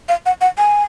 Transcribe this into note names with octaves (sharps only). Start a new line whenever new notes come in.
F5
F#5
F#5
G#5